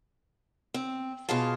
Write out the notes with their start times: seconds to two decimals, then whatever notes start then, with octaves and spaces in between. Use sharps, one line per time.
0.74 C4
1.29 B2 F4 G#4 F5 A5